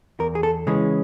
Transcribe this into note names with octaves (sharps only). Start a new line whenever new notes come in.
E2 A#4
G#4
A4
C#3 E3 G#3 C#4 G#4